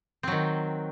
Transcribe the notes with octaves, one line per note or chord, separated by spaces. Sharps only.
D#3 F#3 C4